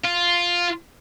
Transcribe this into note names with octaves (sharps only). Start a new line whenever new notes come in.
F4